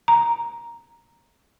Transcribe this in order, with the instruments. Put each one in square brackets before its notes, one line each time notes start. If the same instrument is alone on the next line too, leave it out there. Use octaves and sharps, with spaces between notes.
[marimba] A#5